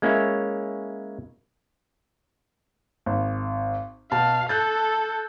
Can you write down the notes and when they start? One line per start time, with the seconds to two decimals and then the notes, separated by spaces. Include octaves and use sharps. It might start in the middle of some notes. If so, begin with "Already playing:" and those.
0.02 G#3 A#3 C#4 E4 C#5 E5
3.06 G#1
4.12 B2 F5 A5
4.49 A4 F#6 G6 A6